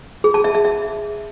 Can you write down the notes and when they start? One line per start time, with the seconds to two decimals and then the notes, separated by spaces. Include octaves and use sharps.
0.24 G#4
0.34 A5
0.44 E5
0.55 E5
0.65 E5